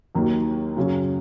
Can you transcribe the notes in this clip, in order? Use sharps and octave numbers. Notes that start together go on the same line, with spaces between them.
D#2 D#3 F#3 A#3
F#2 C#3 F#3 C#4